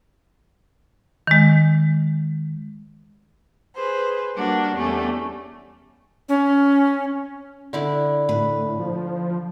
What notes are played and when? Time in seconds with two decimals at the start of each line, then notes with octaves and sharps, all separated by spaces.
1.27 D#3 G#3
3.75 G#4 B4 C5
4.35 G3 A#3 D4 F#4
4.74 E2 G3 A3 C#4
6.29 C#4
7.73 D3 E4 D5
8.29 A2 B4
8.79 F3